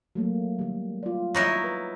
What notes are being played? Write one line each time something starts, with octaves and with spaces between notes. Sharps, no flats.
F#3 A3 A#3
D#3 G3
F4 D5
F#3 D#4 E4
B4